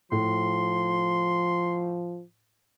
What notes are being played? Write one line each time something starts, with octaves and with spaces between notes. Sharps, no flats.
A2 F3 C6